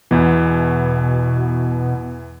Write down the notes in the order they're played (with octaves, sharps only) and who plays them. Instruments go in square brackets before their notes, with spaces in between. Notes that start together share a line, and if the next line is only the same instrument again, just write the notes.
[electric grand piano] E2 E3 [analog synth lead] B2